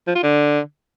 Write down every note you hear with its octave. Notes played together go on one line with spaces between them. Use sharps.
F3
F4
D3